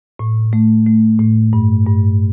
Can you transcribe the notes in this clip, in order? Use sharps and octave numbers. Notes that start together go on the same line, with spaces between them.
A2
A3
A3
A2
G2
G2